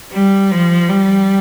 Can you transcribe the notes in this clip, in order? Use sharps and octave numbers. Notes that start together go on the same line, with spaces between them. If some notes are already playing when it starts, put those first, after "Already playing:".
G3
F3
G3